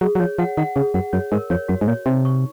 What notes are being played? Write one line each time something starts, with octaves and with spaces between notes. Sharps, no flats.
F#3 G#4
F#3
F3 C#5
F3 F#5
D#3 F#5
C#3 G#4
F#2 F#5
F#2 C#5
G#2 A#4
F2 C#5
F#2 F#4
G#2
A#2 C#5
C3 D#4
C#6